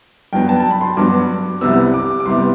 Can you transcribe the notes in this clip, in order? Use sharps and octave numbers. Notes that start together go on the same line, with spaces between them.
G2 F#3 B3 G5
A5
A5
B5
C6
G2 F#3 B3 D6
C2 C3 G3 B3 E6
D6
D6
C2 C3 G3 B3 C6